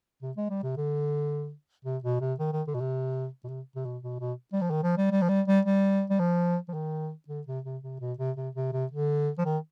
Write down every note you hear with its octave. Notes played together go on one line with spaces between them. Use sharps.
C3
G#3
G3
C3
D3
C3
B2
C3
D#3
D#3
D3
B2
C3
B2
C3
C3
B2
B2
B2
G3
F3
D#3
F3
G3
G3
F3
G3
G3
G3
G3
F3
F3
D#3
D3
C3
C3
C3
B2
C3
C3
C3
C3
D3
F3
D#3